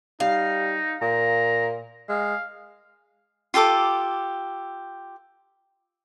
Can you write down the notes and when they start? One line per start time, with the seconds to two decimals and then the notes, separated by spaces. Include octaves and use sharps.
0.20 G3 D#4 F5
1.02 A#2 A#5
2.09 G#3 F5
3.54 F4 G4 A4 D6